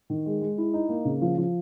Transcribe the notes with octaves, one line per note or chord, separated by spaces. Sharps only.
D#3
G#3
G#3
E4
D#4
A#3
C#3
F3
F3